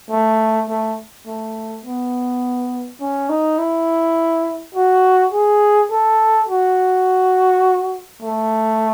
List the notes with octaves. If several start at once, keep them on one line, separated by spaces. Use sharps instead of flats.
A3
A3
A3
B3
C#4
D#4
E4
F#4
G#4
A4
F#4
A3